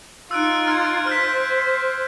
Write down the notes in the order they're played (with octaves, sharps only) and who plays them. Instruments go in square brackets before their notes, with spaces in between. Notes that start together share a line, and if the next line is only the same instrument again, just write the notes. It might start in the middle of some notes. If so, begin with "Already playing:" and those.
[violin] D#4 F4 [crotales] E6 F#6 D7
[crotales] F6 G#6
[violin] C5 [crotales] F6 G6 B6